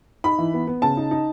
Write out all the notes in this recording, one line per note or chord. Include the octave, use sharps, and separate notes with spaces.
D#4 B5
E3
B3
B3
C#3 A5
D#4
D#4